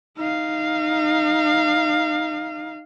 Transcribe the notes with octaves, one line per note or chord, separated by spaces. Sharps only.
D#4 F5